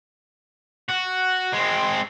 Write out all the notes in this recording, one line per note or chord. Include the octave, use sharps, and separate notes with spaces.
F#4
G#3 C4